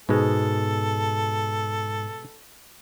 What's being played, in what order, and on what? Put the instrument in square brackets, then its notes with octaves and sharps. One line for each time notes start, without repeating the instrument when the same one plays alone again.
[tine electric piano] G#2 [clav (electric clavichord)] B2 G#3 [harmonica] A4